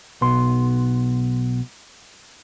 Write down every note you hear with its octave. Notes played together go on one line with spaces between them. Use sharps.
B1 B3 C6